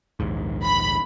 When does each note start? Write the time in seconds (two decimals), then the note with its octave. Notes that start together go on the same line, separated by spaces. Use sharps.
0.20 A#1 D#2 G#2
0.64 B5